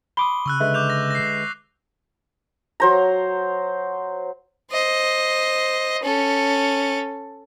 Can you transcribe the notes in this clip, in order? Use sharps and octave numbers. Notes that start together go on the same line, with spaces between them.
B5 C6 D6 D#6 G7
C#3 C#6 E6 F#6
D3 G#3 B4 E5
D6 G6 F7
A#6
A#6 C7
F#3 C5 A#5
C5 D#5
C#4 A4